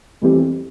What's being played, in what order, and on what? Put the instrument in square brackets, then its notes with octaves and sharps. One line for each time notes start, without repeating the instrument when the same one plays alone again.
[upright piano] F2 E3 G3 C4 G4